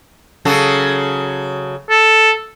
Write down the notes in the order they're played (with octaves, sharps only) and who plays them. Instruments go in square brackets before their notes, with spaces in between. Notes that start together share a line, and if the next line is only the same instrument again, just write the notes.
[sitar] C#3 F#3 A4
[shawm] A4